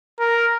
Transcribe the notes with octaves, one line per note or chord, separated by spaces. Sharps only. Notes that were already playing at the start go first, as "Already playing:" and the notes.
A#4